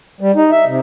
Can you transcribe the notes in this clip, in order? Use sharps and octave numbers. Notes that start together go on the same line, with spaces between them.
G3
D#4
E5
C3